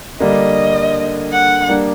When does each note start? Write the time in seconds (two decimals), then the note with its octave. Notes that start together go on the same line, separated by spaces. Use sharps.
0.20 D3 G3 A#3 D4 D#5
1.32 F#5
1.68 G3 A#3 D4